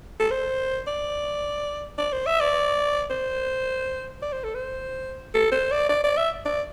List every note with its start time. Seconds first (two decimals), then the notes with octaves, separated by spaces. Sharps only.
0.20 A4
0.31 C5
0.87 D5
1.98 D5
2.13 C5
2.26 E5
2.40 D5
3.10 C5
4.22 D5
4.33 C5
4.44 A4
4.55 C5
5.34 A4
5.52 C5
5.71 D5
5.89 D5
6.04 D5
6.17 E5
6.45 D5